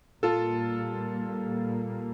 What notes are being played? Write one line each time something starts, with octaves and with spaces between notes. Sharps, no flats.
A#2 G3 A#3 F4 A4